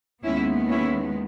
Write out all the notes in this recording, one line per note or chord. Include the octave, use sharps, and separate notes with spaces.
D#2 D#3 G#3 B3 C#4 E4
C#4 E4